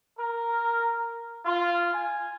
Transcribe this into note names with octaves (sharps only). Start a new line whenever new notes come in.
A#4
F4
G#5